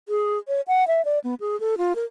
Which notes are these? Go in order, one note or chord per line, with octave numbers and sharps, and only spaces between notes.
G#4
C#5
F#5
E5
D5
B3
G#4
A4
F4
A#4